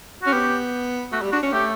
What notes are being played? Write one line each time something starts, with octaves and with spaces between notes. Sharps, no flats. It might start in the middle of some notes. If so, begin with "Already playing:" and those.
C#4 F#4
B3 G4
A3 F#4
G3
D4 F#4
C#4
A3 G4